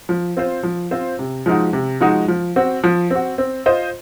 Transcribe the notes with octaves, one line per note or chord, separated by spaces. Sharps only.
F3
C4 F4 C5
F3
C4 F4 C5
C3
F3 G#3 D#4 F#4
C3
F3 G#3 D#4 F#4
F3
C4 F#4
F3
C4 F#4
C4
F4 C5 D#5